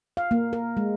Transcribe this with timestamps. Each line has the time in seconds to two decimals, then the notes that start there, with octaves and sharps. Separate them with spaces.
0.17 F5
0.31 A#3
0.53 A#4
0.77 G#3